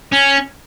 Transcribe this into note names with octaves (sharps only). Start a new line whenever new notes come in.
C#4